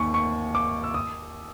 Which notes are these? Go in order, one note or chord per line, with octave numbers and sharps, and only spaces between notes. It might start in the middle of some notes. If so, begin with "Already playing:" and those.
Already playing: D#2 D#3 G#5 C#6
C#6
D6
E6
D#6